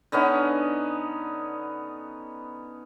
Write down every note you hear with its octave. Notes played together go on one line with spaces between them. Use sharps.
D3 B3 C#4 D#4